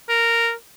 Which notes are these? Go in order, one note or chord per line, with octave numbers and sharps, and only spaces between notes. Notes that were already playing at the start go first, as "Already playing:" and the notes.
A#4